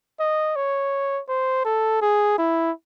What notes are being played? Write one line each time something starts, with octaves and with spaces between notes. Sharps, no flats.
D#5
C#5
C5
A4
G#4
E4